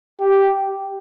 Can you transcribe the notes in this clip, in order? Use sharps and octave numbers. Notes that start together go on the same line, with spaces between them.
G4